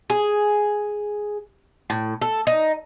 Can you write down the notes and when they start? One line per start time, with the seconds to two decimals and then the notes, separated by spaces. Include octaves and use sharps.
0.10 G#4
1.90 A2
2.22 A4
2.47 D#4